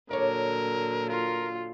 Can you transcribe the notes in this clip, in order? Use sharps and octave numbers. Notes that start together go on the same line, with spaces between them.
A#2 D3 F#3 A#4 C#5 D5
F4 A#4